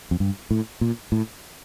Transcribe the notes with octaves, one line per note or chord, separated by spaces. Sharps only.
F2
G2
A2
A#2
A2